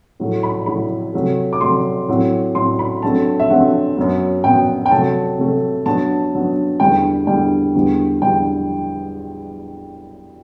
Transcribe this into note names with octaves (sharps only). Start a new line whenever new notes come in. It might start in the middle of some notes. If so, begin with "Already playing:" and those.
A2 F#3 A3
B5
A2 F#3 A3 B5
C3 F#3 A3
D6
C3 F#3 A3 C6
A2 F#3 C4
A2 F#3 C4 C6
B5
G2 F#3 A3 C4 A5
E5
G2 F#3 A3 C4 F#5
F#2 F#3 B3
F#2 F#3 B3 G5
G5
C3 F#3 A3 A5
C3 F#3 A3
G2 F#3 B3 A5
G2 F#3 B3
E2 D3 G3 B3 G5
E2 D3 G3 B3 G5
E2 D3 G3 B3
E2 D3 G3 B3 G5